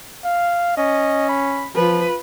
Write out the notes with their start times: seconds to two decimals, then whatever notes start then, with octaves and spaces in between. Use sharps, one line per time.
0.25 F5
0.77 C#4 D#5
1.29 B5
1.75 F3 F4 B4